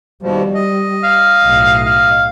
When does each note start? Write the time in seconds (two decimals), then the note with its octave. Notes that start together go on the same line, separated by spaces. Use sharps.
0.23 D#2 B2 F3 G3
0.54 D#5
1.04 F5
1.45 B1 A2
1.86 F5